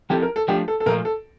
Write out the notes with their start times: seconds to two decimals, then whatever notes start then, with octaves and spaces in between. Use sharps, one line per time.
0.10 F3 C4 E4 G4 A4
0.22 A#4
0.36 A4
0.48 F3 A3 D4 G4
0.68 A4
0.80 A4
0.86 A#2 F3 A3 A#4
1.05 A4